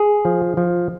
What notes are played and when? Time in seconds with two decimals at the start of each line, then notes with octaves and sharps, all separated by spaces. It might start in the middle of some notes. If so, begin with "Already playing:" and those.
Already playing: G#4
0.25 F3
0.57 F3